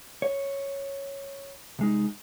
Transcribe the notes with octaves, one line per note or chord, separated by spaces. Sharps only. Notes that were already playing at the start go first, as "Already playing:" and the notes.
C#5
C2 G#3 D#4